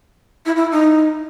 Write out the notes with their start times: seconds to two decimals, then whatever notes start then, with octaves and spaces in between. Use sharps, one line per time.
0.46 E4
0.56 E4
0.71 D#4